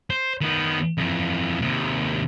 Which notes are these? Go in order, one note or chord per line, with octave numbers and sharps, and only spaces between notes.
C5
D#3 B3
F2 E3
D#2 C3